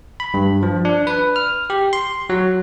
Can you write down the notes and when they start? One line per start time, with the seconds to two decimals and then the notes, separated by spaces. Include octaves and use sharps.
0.20 B5
0.34 G2
0.63 F3
0.85 D4
1.07 B4
1.36 F6
1.70 G4
1.93 C6
2.30 F#3